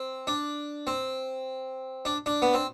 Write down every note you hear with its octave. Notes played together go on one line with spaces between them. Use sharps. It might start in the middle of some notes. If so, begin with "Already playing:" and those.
Already playing: C4
D4
C4
D4
D4
B3
C4